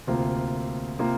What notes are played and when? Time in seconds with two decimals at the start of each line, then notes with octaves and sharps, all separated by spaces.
0.07 D2 C3 A#3 F4
0.99 C3 A#3 F4